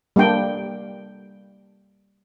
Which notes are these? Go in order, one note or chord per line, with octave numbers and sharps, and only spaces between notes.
G3 A#3 D4 G5